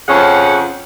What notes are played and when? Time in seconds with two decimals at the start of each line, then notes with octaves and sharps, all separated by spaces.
0.07 F2 C#3 C#4 G#4 F#5